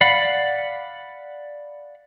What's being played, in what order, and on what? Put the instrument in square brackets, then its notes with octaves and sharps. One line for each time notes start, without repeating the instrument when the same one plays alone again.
[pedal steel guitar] D5 F5 F#5 B5